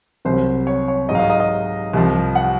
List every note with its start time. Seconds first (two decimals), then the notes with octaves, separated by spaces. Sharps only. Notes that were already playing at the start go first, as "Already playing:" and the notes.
0.25 C2 C3 F#3 C5
0.67 C#5
0.88 C#5
1.09 G#2 F#3 D#5
1.15 F5
1.19 D#5
1.30 D#5
1.40 D#5
1.93 C2 C3 F3
2.35 F#5